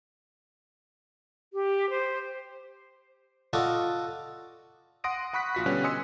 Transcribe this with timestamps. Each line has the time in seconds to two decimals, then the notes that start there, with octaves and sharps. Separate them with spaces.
1.53 G4
1.90 C5
3.53 F4 F#4 A4 D5 D#5
5.04 F#5 C6 D#6 A#6 D7 D#7
5.33 F#5 B5 C#6 F#6 B6
5.55 A#1 F4 F#4 F#6 B6
5.66 B2 D3 G3 C#4 B4 F#6
5.84 D#5 G#5 C6 D#6 E6 C#7